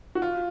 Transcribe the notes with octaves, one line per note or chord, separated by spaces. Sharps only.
F#4
F4